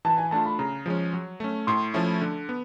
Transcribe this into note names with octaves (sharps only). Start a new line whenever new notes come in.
E3 A5
G#5
A3 D4 F4 A5
B5
C#3 A#5
F3 G#3 C#4
F#3
A3 C#4
A2 C6
F3 A3 C#4 E4
D3
B3